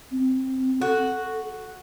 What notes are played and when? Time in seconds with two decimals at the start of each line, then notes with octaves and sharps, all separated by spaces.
0.11 C4
0.82 F#4 A4